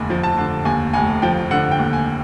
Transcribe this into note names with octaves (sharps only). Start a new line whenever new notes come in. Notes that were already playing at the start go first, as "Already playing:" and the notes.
Already playing: F1 D#2 D3 G#5
F3
A5
D3
D#2 G#5
F1 G#5
F3 G5
D3 F#5
G5
D#2
G#5